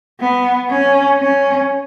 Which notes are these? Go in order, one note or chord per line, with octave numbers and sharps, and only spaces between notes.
B3
C#4
C#4